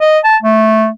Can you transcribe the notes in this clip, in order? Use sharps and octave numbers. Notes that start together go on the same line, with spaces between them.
D#5
A5
A3